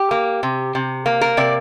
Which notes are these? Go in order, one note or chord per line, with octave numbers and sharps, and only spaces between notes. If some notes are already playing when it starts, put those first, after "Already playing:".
Already playing: G4
A#3
C3
C3
A#3
A#4
C3 D5